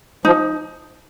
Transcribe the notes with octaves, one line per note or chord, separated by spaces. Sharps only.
F3 D#4